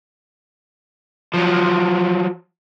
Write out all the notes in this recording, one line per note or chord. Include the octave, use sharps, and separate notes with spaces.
F3 F#3